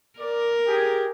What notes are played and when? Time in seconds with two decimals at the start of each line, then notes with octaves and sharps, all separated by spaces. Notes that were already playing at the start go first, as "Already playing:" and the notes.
0.19 A#4 D5
0.68 G4 G#4